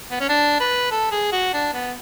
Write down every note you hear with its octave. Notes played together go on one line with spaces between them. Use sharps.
B3
C#4
D4
B4
A4
G#4
F#4
D4
B3